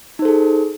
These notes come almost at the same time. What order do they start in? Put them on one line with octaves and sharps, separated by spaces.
D#4 C5 A4 G#4